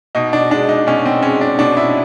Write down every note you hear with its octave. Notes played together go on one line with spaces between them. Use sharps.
B2 D#4
D4
G#3 D4
D#4
B2 C#4
C4
G#3 C#4
D4
B2 D4
E4